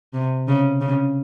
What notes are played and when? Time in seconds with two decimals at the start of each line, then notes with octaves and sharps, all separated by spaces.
0.14 C3
0.48 C#3
0.81 C#3